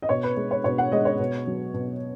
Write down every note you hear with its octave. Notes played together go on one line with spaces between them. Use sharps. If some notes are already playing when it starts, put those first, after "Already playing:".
D#5
B2 C#5
B4
G#3
C#5
B2 C#5
F#5
G#3 D#5
C#5
B2
F#3
B2